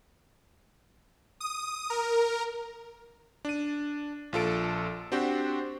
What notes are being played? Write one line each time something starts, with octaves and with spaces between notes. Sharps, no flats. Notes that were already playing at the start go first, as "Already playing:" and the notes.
D#6
A#4
D4 D#7
A#1 F4 A4 D7
C4 D4 F#4 G4 C5